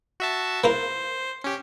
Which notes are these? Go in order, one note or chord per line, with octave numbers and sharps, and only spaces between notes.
F#4 E5 A5
A#3 E4 A#4 C5
C#4 G4